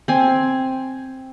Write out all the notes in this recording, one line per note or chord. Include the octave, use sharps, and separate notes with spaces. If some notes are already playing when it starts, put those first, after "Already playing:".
C4 G#5